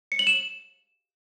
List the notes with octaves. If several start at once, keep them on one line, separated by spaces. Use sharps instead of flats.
C#7
F#7
E7